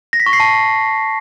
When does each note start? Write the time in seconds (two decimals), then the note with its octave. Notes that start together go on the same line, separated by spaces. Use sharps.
0.13 A#6
0.20 B6
0.26 C#6
0.33 C7
0.40 A5